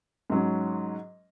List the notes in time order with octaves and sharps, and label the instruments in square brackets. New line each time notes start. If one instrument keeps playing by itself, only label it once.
[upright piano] G#2 F#3 C#4